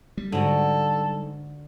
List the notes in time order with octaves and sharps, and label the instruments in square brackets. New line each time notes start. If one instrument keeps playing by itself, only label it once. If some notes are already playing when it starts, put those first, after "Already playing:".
[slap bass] G3
[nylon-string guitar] G#2 [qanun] D3 F#4 [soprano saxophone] A4